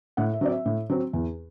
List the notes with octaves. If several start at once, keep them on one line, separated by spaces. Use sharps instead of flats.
A2 F#5
E5
F#3 C4 D5
E5
A2
F#3 C4
E2